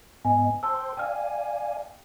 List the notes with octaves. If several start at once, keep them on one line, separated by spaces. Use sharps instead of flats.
G#2 B3 D#5 G#5
C5 G5 A5 C6 E6
D5 F5 G5 G#5 F6